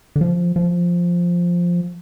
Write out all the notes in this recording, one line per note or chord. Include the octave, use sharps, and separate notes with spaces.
D3
F3
F3